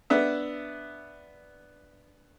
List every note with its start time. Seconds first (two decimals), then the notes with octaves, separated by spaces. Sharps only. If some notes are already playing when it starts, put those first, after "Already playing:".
0.10 B3 D4 E5